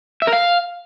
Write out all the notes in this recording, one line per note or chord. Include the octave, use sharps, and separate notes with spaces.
E5
A#4
F5